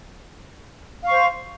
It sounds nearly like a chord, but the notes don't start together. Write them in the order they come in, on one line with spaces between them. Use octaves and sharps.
F5 C#6 C5